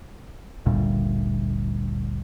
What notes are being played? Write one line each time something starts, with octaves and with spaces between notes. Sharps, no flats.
G1 D2 A#2 G3